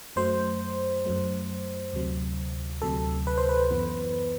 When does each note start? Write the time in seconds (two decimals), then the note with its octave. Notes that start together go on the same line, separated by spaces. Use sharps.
0.16 F#2 F#3 A3 C5
1.06 F#2 F#3 A3
1.93 D2 C3 F#3
2.82 D2 C3 F#3 A4
3.27 B4
3.38 C5
3.49 B4
3.70 F#2 E3 B3